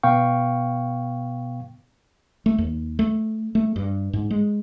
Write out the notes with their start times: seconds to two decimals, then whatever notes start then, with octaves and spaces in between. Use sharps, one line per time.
0.03 B2 B3 F5 G5 C#6
2.46 A3
2.58 D#2
2.99 A3
3.55 A3
3.76 G2
4.13 G#2
4.31 G#3